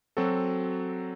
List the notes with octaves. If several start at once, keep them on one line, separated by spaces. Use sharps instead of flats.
F#3 C4 F#4 A4